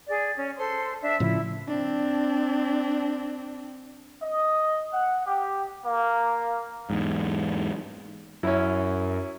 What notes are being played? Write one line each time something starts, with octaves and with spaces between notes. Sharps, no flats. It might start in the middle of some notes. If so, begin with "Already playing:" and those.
G#4 D5
C#4
A4 C5 C6
D4 E5
A2 C#3 F3 E4
C4 D4
D#5
F#5
G4
A#3
E2 G#2
F#2 C#4 E4